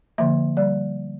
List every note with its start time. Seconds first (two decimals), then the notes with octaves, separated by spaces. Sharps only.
0.18 D3 F3 A#3 E5
0.57 G3 D5